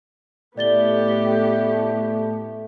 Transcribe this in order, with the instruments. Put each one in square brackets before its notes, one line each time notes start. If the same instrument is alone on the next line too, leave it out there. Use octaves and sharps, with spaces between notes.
[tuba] A2 [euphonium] A3 [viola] B3 G4 [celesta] D5 A6 G7